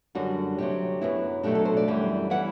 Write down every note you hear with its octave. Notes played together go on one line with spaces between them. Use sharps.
F#2 D3 G3 D4 F#4
D2 C3 F#3 G4
F#2 F#3 B3 E4
B2 F#3 A3 D4 G4
A4
C5
D5
F#2 E3 G3
E3 G3 B3 E4 F#5